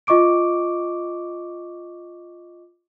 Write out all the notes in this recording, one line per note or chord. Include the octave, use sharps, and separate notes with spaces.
F4 D#5 C#6 D6 D7